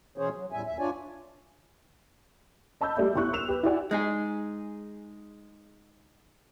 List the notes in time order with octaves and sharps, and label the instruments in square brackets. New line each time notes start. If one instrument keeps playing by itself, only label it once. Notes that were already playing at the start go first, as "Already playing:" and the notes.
[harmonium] B2 E3 C#4 G#4 C5 C#5
F#3
E2 A2 G3 E5 G#5
D#2 E5
G2 D4 F4 C#5 D5 G#5
[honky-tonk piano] D#5 A5 B5 E6 G6
G3 A3 A4 D5 E5
G1 E4 C#6 F#6
E6 E7 F7
G4 B4
E4 F#4 G4 D5 F#5 G#5
[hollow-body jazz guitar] G#3 D#4 G#4